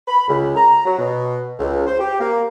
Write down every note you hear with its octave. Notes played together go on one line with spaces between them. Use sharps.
B5
C#2
A#5
F#3
B2
C#2
C5
G4
A#3